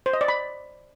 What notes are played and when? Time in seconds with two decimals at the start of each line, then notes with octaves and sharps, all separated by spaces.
0.06 C5
0.13 D#5
0.21 D5
0.28 B5